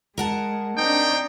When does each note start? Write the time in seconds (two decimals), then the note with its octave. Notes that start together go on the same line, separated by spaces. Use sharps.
0.18 G#3 A#4 F#5 A5
0.77 C4 D4 D#4 G5